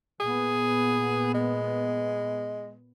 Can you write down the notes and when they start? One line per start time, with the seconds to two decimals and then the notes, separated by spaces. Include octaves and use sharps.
0.20 A#2 B3 G#4
1.34 G#3